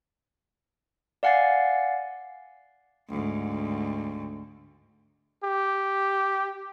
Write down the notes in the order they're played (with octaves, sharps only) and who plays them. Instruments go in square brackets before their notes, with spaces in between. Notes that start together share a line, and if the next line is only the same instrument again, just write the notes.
[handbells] D5 F5 F#5 G#5 A6 C7
[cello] D2 G#2
[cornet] G4